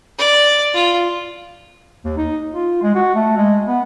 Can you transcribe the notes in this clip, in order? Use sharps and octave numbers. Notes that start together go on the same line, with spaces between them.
D5
F4
D#2
D#4
F4
G#3
F#4
A3
G#3
B3